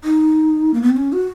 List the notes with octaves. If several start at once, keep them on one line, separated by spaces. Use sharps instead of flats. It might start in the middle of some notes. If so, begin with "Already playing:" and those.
D#4
A#3
B3
C4
C#4
F#4